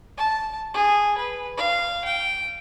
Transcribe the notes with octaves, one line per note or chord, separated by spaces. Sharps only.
A5
G#4
B4
F5
G5